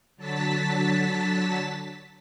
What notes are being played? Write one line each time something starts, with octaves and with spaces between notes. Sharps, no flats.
D3 F#3 A5 A6 B6